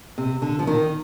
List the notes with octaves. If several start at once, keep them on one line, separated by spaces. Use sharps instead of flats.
C3
D3
F3
D#3